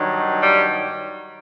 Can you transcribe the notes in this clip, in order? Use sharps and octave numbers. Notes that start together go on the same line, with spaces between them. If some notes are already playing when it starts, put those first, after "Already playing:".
Already playing: G2 D#3 F#3
G3